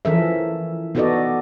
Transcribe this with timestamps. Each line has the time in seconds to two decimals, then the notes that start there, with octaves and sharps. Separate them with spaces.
0.05 E3 F3 C#4 A4 A#4 E5
0.95 B3 D#4 F#4 A4 D5 D#5